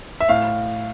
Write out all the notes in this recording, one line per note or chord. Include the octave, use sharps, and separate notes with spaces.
E5
A2 F5